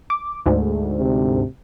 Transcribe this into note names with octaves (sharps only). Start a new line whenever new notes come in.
D6
D2 G#2
C3